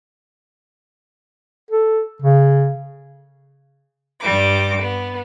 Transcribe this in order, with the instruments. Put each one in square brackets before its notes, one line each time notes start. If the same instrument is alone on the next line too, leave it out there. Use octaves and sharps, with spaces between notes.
[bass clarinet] A4
C#3
[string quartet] G2 G3 D6
B3